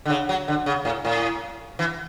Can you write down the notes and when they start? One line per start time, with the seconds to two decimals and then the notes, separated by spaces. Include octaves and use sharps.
0.06 D3
0.10 C#3
0.29 F#3
0.48 D3
0.66 C#3
0.85 A2
1.05 A2
1.79 E3